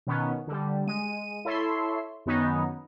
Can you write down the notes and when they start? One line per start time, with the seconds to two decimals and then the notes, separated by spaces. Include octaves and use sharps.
0.07 B2 D#3 B3 C#4
0.47 D3 G3
0.87 G#3 D#7
1.45 E4 A4 C#5 E5 C6
2.26 F#2 D#3 B3 C#4 D#4